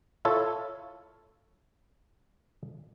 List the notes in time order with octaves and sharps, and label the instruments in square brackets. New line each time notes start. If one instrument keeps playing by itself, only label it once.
[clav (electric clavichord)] E4 F4 A4 C#5